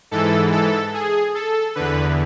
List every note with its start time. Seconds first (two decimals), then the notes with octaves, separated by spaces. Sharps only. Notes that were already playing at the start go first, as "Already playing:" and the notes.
0.11 G#2 E3 A4
0.52 A4
0.94 G#4
1.35 A4
1.75 E2 D3 B4